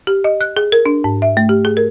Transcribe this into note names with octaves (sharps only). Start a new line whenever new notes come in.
G4
D#5
F#6
G#4
A#4
D4
G#2
E5
A3
G4
G#4
A#4